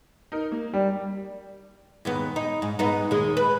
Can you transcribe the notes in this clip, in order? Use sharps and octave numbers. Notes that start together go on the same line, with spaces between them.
D#4 A#4
A#3
G3
D#2 G#2 B3
D#4
G#2
G#2 B3 D#4
D#2 G#3
B4